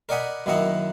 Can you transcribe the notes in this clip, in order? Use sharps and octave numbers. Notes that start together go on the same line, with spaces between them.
A#4 D5 D#5 F#5 G#5 B5
F#2 D#3 A#3 E4 D#5 F#5